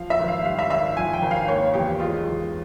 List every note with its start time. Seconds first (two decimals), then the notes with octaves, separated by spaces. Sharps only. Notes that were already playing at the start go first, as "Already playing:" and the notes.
Already playing: F3 F5
0.10 E5
0.19 G#1
0.28 F5
0.45 G3 F5
0.59 E5
0.70 G#1 E5
0.97 F3 G#5
1.13 G5
1.22 G#1
1.31 F5
1.48 A#3 C#5
1.74 E2 G4
2.00 G#3 F4
2.25 E2